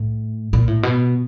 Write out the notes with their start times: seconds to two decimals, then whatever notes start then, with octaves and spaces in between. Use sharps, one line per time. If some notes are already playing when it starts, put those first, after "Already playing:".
Already playing: A2
0.53 A#2
0.68 A2
0.83 B2